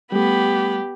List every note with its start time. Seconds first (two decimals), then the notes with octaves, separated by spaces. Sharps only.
0.12 G3 A3 B3 G4 B5